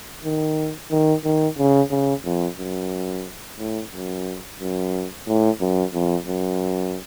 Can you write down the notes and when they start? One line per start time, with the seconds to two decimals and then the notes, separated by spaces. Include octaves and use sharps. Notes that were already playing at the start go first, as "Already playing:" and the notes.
0.24 D#3
0.90 D#3
1.24 D#3
1.58 C#3
1.91 C#3
2.25 F2
2.58 F#2
3.59 A2
3.92 F#2
4.60 F#2
5.27 A2
5.60 F#2
5.93 F2
6.27 F#2